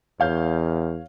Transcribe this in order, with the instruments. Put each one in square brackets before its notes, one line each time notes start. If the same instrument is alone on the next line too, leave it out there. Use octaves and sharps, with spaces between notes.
[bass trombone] E2 [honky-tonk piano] C#5 F5 G6